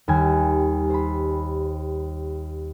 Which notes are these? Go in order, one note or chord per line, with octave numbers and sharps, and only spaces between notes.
D#2 G3 G#5
C5 B5